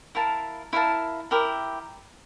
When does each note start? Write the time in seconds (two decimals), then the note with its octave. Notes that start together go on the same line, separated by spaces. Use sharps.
0.15 E4 A#4 F5 A5
0.73 E4 A#4 F5 A5
1.31 E4 G4 A#4